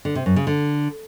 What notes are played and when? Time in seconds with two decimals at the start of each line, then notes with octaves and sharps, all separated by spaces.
0.05 D3
0.15 C3
0.26 F#2
0.36 C#3
0.47 D3